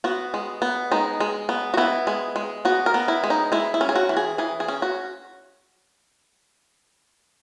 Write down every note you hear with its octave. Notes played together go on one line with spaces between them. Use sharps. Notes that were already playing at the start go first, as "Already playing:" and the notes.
B3 F#4
G#3
B3
G#3 D#4
G#3
B3
F#4
B3 E4
G#3
G#3
B3 F#4
A#4
B3
E4
G#3
D#4
G#3 E4
E4
C#4
G#4
F#4
E3
G#4
E3 G#4
G#4
C#4
F#4